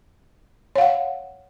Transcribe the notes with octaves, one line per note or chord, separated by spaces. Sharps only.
C#5 F5 F#5